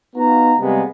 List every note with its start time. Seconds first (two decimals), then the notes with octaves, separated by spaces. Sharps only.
0.16 B3 D#4 F4 F#4 A#5
0.59 C3 G3 G#3 A#3 B3